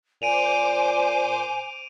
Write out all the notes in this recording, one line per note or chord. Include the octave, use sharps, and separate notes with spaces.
A#2 C5 G#5 D6 D7 D#7 F7